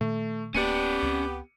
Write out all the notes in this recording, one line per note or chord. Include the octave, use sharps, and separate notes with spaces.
A#2 D#3 A3
D1 A#3 B3 C#4 G4 D5 C#7 D#7
C#2 G3 C4